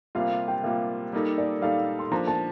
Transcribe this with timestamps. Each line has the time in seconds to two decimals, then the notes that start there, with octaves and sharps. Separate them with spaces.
0.15 C3 G3 A#3 F4 F5
0.48 G5
0.64 C3 G3 A#3 F4 F5
1.13 G3 A#3 D#4 A4
1.38 D5
1.62 G3 A#3 D#4 A4 F5
1.99 C6
2.11 F3 A#3 D4 A#5
2.27 A5